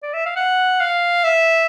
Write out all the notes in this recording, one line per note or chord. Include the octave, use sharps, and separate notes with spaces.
D5
E5
F5
F#5
F5
E5